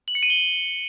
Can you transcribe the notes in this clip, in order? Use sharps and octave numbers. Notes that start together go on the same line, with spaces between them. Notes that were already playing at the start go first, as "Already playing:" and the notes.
F#7
C#7
D#7
G7